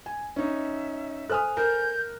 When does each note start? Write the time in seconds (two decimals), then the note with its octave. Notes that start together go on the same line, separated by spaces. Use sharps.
0.06 G#5
0.36 C#4 D#4 E5
1.30 A4 C5 G#5 D#6 F6 F#6
1.57 A#4 G6